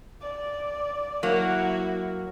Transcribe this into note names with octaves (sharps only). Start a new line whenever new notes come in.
D5
F#3 A#3 E4 F#4